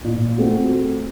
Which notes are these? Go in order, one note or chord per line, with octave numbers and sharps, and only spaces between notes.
A#2
A3 C4 F#4